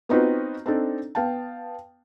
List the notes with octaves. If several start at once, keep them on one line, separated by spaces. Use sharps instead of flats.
B3 C4 D#4 F4 F#4 B4
C4 D4 D#4 A4
B3 F5 G5 A5